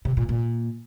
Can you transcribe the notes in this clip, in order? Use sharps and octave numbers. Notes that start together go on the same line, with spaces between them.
C3
A#2
A#2